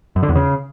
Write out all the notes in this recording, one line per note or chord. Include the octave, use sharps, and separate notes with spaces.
F#2
D3
E2
C#3